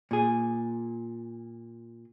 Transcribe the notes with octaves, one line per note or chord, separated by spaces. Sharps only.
A#2 G#4